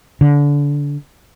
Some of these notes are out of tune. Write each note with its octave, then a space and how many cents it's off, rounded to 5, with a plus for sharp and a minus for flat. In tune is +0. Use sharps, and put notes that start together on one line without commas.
D3 -25